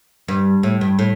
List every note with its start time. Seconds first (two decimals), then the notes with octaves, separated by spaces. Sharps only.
0.28 G2
0.63 A2
0.81 G2
0.99 A2